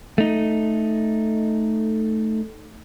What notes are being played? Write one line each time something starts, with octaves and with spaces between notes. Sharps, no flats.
A3 D#4